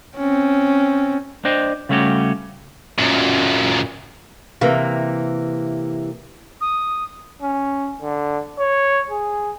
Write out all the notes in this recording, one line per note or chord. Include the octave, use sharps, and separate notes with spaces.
C4 C#4
D4 C5 D#5 G5
C#3 G3 A3 C#4 F#4 G4
F#2 A#2
C3 E3 A#3
D#6
C#4
D3
C#5
G#4